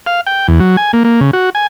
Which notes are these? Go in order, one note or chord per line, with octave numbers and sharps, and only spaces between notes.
F5
G5
E2
F#3
G#5
A#3
A#3
C#3
F#4
G#5